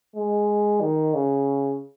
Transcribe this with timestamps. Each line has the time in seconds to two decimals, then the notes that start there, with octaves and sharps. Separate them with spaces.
0.16 G#3
0.81 D#3
1.14 C#3